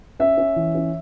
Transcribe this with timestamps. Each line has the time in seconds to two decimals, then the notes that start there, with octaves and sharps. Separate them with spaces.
0.20 C#4 E5
0.37 C#4
0.56 E3
0.75 C#4